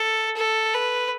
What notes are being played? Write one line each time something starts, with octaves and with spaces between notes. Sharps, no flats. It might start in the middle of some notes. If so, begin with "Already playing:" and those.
Already playing: A4
A4
B4